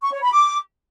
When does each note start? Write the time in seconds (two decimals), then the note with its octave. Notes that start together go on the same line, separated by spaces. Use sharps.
0.03 C#6
0.13 C#5
0.23 B5
0.33 D6